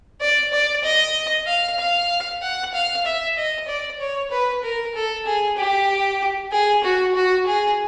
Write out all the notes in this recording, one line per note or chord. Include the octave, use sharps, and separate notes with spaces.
D5
D5
D#5
F5
F5
F#5
F5
E5
D#5
D5
C#5
B4
A#4
A4
G#4
G4
G#4
F#4
F#4
G#4